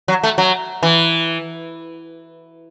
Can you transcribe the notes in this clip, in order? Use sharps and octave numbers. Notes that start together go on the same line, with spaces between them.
F#3
A3
F#3
E3